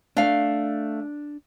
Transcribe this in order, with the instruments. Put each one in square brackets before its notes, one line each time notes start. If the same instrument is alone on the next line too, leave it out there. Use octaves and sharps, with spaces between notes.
[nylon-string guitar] A3 F5 [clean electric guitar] D4